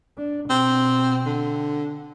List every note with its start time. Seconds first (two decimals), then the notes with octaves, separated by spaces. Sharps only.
0.18 D4
0.50 B2 C4
1.26 D3